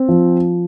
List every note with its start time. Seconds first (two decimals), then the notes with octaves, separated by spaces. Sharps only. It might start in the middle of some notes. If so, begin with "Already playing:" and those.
Already playing: C4
0.08 F3